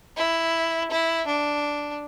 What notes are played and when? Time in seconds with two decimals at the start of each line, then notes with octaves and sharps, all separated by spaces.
0.17 E4
0.91 E4
1.27 D4